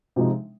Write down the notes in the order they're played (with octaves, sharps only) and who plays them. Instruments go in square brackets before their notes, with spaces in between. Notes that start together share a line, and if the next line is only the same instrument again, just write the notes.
[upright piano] C3 F3 G#3 D#4